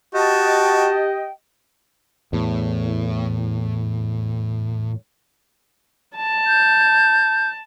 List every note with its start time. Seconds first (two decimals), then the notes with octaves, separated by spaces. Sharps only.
0.15 F#4 G4 D#5 G5 A5
2.33 E2 A2
6.16 A5
6.47 G6